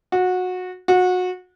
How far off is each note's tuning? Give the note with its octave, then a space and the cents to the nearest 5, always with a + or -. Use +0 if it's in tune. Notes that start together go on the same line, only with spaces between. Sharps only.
F#4 -20
F#4 -25